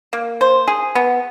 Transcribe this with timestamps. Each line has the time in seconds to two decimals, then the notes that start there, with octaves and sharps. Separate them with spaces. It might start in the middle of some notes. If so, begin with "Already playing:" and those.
0.13 A#3
0.41 C5
0.68 G#4
0.95 B3